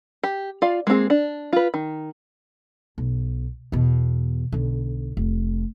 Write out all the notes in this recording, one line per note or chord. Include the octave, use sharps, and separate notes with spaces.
G4
F4 D5 F5
G#3 A#3 C4 G#4
D4
F4 B4
D#3
B1
E2 B2
B1 D3
F1